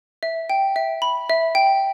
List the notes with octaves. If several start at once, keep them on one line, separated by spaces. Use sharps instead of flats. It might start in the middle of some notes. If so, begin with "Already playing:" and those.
E5
G5
E5
B5
E5
G5